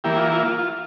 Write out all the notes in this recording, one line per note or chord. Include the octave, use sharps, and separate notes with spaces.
E3 A#3 E4 G4
F4
F4
F4
F4